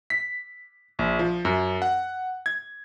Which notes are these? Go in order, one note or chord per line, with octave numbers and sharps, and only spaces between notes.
B6
A#1
F3
F#2
F#5
G#6